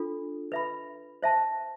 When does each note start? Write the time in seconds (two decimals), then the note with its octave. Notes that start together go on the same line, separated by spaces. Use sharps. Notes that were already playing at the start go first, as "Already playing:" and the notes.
Already playing: D4 F4 A4
0.52 B4 E5 B5
1.23 C5 E5 A5